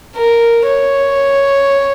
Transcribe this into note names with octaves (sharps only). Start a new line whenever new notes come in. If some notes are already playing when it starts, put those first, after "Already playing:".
A#4
C#5